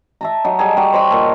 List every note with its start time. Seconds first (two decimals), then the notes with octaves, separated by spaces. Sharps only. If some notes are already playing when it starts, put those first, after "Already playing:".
0.21 E5 A5 A#5
0.45 F#3 D#4
0.59 G3 D#4 G#4 A4
0.77 G3 D#4 F#4 D5
0.93 C5 C#5 D#5 B5
1.11 A#2 A4